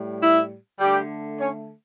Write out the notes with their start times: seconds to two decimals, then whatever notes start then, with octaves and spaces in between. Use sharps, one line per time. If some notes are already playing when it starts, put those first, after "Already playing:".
Already playing: A2 G3
0.20 E4 E5
0.79 D3 G3 A3 G4
1.38 C#4 C#5